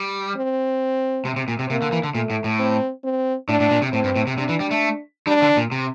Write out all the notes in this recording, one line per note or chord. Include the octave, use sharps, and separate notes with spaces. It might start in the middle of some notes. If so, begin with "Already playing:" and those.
Already playing: G3
C4
C3
C3
A#2
C3
C3 A#3
D3
E3
D3
A#2 A3
A2
A2
C4
C4
A2 D4
A2
A#2
C3
A2 C4
G2
A2
C3
C3 D4
E3
G3
A3
G3 D4
D3
A#2
C3